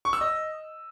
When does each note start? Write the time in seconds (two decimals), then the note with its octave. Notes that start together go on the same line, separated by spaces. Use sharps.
0.05 C#6
0.13 E6
0.21 D#5